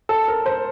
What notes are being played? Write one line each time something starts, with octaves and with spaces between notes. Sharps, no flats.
A4
A#4
C5